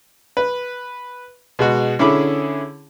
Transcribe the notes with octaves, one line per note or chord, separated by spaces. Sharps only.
B4
B2 G#3 F#4
D3 C#4 E4 G#4 B5 D6